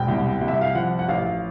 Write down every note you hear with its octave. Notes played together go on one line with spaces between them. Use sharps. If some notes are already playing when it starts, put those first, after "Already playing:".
Already playing: E1 G5
C2
C2
E5
F5
F3 F#5
F#5
A1 F5
F5